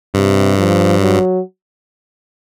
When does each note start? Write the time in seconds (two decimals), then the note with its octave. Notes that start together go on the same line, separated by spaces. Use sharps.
0.14 G2 C3
0.58 F3
1.01 F#3